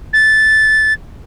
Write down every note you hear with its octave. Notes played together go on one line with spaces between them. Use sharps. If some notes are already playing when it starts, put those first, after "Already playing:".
A6